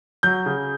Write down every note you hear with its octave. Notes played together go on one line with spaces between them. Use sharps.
F#3 G6
C#3